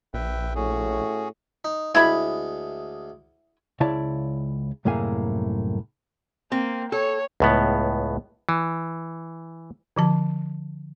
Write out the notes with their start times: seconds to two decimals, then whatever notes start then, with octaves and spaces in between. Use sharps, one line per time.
0.14 A#1 B4 E5 G5
0.55 A2 C#4 F#4 G#4
1.65 D#4
1.95 D2 G#3 E4 B5
3.80 C#2 C#3 E4 C#5 D5 A5
4.85 C2 F#2 A2 A#3 G#4 G#5
6.52 A#3 C4
6.92 A4 C#5
7.40 C#2 A2 B3
8.49 E3
9.96 D3 F3 A5